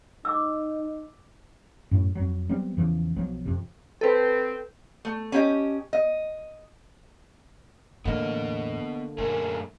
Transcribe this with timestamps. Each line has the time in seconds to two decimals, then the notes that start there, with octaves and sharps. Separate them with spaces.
0.25 D#4 D6 E6
1.91 F#2 A2
2.15 F2 F#3
2.49 F#3 G3 B3 C4
2.77 E2 C#3 E3 F3
3.16 B1 F3 F#3
3.45 F2 C3
4.01 C4 A4 B4
5.05 A3
5.32 C#4 G4 D#5
5.93 D#5
8.05 E2 A2 D3 A#3 B3 D#5
9.18 F#2 A#2 A3 G#4 A#4